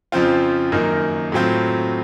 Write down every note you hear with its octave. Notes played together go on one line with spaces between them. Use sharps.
F2 C#3 F3 C4 F4
F#2 D#3 A#3 D#4
A2 F#3 C4 F4